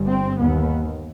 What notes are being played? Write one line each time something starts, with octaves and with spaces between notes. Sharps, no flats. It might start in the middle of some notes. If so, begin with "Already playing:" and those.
Already playing: G1 G2
C4
D#2 B3